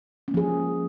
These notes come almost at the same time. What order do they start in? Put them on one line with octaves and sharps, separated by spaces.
C#4 A#3 F3 G#4